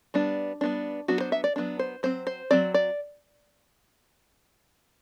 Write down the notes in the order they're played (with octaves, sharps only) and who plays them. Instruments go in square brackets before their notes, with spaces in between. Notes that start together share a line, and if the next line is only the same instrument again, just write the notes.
[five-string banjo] G3 B3 D4
G3 B3 D4
F#3 B3 D4 F#4
C5
E5
D5
F#3 B3 D4
C5
F#3 C4 C5
C5
F#3 C4 D5
D5